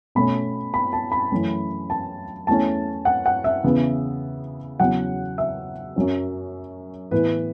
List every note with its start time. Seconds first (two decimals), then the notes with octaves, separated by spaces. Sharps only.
0.15 B2 A3 C#4 B5
0.74 B5
0.93 A5
1.12 B5
1.32 F#2 E3 A3 C#4
1.90 A5
2.47 E2 E3 A3 C#4 A5
3.05 F#5
3.26 F#5
3.44 E5
3.64 E2 C#3 E3 B3
4.79 E2 C#3 F#3 C#4 F#5
5.38 E5
5.96 F#2 F#3 C#4
7.11 A2 E3 B3 B4